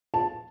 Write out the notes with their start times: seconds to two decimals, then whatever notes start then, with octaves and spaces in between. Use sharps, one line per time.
0.14 A5